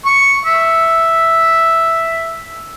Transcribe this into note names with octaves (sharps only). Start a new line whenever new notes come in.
C#6
E5